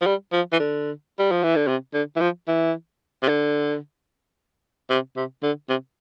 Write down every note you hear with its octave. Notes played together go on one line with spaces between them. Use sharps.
F3
G3
F3
E3
D3
G3
F3
E3
D3
C3
D3
E3
F3
E3
C3
D3
C3
C3
D3
C3